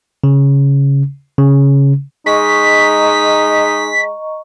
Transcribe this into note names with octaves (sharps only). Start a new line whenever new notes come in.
C#3
C#3
G#3 D#4 D#5 A#5 C#6 B6